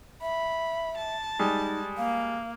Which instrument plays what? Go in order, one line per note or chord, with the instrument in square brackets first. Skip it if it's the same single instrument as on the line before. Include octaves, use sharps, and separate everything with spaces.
[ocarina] E5 [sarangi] B5
[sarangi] A5
[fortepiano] G3 G#3 [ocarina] D#4
[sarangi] A#3 [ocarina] F5